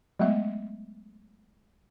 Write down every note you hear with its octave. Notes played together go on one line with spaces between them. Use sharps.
F#3 G#3 A3 B3 E5